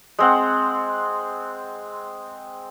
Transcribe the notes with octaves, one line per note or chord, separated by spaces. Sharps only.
G#3 C4 F#5